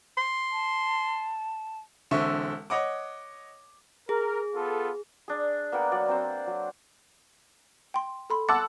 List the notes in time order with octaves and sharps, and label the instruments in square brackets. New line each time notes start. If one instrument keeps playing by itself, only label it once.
[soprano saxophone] C6
[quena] A5
[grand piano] E1 D3 C4 E5 C#6
C#5 D#5 F#5 D6
[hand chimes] G#4 [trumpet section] A#4
[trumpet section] B3 F4 A4
[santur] D4 G#4
A#3 B3 F#5 G5
F#3 D5
C4 C5
F#3
[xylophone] G5 C6
A4 B5 C6
[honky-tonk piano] F#5 A5 E6 [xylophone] C6 D6 A6